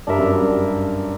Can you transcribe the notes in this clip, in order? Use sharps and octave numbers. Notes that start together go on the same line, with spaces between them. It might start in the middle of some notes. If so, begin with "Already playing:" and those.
G2 D4 A#4 E5
F#2
G2
G2